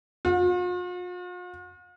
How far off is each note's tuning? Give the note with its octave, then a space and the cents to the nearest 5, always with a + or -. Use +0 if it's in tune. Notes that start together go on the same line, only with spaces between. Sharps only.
F4 +45